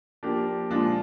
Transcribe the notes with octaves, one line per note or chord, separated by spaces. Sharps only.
F3 A#3 D4 G4
A#2 F3 G#3 D4 F4